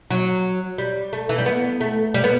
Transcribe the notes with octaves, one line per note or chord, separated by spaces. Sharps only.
F#3
G3
A3
E3
G3
B3
A3
G3
B3